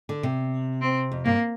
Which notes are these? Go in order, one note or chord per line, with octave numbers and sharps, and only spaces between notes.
D3
C3
C4
F2
G2 A#3